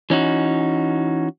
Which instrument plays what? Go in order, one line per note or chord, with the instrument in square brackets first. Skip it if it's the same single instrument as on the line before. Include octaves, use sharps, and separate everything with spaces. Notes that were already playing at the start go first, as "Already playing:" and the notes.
[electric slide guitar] E3 C#4 D#4 F#4